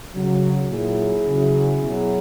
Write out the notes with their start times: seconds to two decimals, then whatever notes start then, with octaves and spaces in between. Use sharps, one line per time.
0.15 C#3 F#3
0.70 A#2 F#3 E4 G#4
1.27 C#3 F#3
1.82 B2 F#3